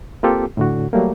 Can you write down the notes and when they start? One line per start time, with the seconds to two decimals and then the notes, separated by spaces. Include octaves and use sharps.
0.23 A#3 C4 F4 G4 A4
0.57 A2 D3 F#4
0.93 F#3 G3 A3 A#3